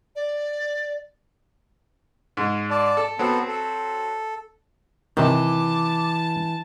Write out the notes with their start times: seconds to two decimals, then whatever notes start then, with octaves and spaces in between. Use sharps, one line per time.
0.16 D5
2.37 G#2 G#3
2.70 D5 A5
2.97 A4
3.19 F#3 B3 C4 A4
3.48 A4
5.17 C3 D#3 E3 A5 D6